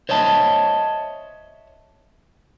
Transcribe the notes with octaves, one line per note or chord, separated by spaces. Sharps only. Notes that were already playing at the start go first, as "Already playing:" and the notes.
C5 C#5 D#5 E5 A5